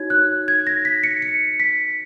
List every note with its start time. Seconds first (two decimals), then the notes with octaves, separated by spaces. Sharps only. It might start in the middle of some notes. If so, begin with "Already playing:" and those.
Already playing: D#4 F#4 C#5 G#6
0.10 F#6
0.48 G#6
0.67 A#6
0.85 B6
1.04 C#7
1.22 C#7
1.60 B6